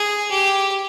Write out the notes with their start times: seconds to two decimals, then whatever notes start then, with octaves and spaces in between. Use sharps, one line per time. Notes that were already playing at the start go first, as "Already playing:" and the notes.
Already playing: G#4
0.31 G4